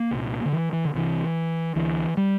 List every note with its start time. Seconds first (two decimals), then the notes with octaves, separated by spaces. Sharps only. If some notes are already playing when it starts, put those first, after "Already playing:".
Already playing: A#3
0.11 C2 A#2
0.45 D3
0.53 E3
0.73 E3
0.85 D3
0.93 C2 C3 E3
1.76 D2 D3 E3
2.17 G3